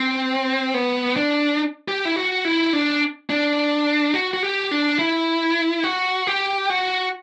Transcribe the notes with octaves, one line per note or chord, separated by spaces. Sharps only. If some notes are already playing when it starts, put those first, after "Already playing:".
Already playing: C4
B3
D4
G4
E4
F#4
E4
D4
D4
F#4
F#4
G4
D4
E4
F#4
G4
F#4